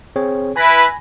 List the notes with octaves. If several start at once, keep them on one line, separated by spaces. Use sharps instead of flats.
C4 G#4 C#5
E4 B4 G#5 B5 A#6